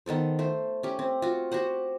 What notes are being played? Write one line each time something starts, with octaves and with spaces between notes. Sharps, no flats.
D#3 B3 A4 C5
A3 C5
C#4 G4
C4
F4 F#4
F#4 G4 C5 F#5